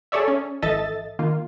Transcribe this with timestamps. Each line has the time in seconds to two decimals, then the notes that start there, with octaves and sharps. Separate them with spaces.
0.12 G#4 A4 C#5 D5 E5
0.28 C#4
0.62 G#1 E3 A4 D#5 E5 A6
1.19 D#3 A#3 F4